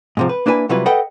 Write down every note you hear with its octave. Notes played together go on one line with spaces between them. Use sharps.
G#2 C3 F3
B4
A#3 D4 E4 B4 G#5
C3 F#3 G3 E4 F4 B4
A4 B4 D#5 F#5 G5